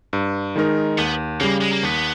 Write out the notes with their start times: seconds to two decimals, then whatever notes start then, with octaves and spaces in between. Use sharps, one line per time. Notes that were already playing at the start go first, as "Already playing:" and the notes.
0.13 G2
0.56 D#3 G#3 D#4 A#4
0.98 D#2 B3
1.40 C#3 G3 A#3
1.61 G#3
1.72 A#3
1.83 D#2 B3